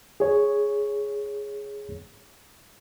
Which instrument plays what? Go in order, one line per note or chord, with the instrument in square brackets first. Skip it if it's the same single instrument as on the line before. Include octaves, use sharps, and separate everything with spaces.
[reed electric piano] G#4 C#5